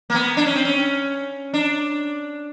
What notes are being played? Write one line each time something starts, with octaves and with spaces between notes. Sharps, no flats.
A#3
B3
D4
C#4
C4
C#4
D4